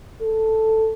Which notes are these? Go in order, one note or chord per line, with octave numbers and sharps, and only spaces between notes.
A4